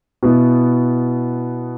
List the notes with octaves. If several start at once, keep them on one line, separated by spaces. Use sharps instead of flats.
B2 B3 E4